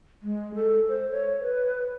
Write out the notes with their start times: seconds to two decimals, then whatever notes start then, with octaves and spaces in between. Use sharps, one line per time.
0.22 G#3
0.55 A4
0.88 C5
1.11 C#5
1.41 B4